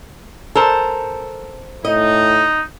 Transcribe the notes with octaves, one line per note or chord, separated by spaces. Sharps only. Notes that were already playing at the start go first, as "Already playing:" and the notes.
A4 A#4 C5 A5
A2 D#4 D#5